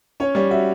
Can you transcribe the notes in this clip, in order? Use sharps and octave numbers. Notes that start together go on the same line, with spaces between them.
C#4 C#5
G3 C#5
F#4 E5